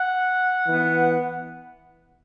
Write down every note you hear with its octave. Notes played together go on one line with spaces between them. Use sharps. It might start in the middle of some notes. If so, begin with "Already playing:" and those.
Already playing: F#5
E3 B3